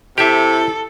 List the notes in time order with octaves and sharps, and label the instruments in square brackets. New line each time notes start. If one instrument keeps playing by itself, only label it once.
[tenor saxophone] C3 [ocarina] E4 [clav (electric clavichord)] G4 E5 [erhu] A4